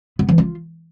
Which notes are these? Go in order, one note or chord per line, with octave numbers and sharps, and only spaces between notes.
B3
E3
F4